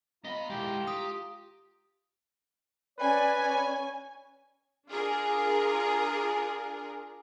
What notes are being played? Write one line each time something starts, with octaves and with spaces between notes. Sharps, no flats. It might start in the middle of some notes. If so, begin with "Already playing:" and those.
B3 F4 D#5 A#5 B5
G#3 E4 G4
G4 D#6
C#4 B4 C#5 D5 G#5
D4 F4 G#4 A#4